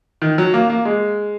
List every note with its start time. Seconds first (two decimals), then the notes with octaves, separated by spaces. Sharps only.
0.22 D#3
0.38 F#3
0.54 A#3
0.70 A#3
0.85 G#3